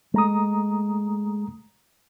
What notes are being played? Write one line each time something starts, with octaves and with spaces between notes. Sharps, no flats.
G#3 A3 A#5 D#6